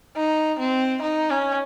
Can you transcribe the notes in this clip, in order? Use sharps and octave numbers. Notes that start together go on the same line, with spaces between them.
D#4
C4
D#4
C#4